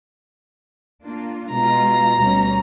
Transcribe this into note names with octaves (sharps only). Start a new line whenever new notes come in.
A#3 D4 F4
B2 G#3 F4 A#5
D2 B2 G3 C#4